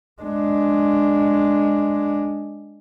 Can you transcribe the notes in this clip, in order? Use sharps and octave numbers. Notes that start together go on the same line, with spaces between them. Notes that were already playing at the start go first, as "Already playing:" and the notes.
G#3 D4